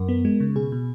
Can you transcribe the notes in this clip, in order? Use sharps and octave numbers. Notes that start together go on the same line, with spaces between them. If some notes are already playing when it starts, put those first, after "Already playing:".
Already playing: F#2 A#4
B3
G#3
C#3
B2 G#4
B2